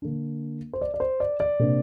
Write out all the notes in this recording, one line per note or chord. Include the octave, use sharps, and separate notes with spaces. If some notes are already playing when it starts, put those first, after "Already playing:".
D3 A#3 D4
C5
D5
D5
C5
D5
D5
C3 A#3 D4